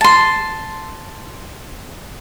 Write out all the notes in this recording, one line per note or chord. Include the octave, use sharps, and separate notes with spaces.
A5 C6